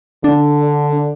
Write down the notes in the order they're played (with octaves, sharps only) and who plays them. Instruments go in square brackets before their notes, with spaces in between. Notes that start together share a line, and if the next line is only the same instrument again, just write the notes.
[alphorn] D3 [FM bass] D4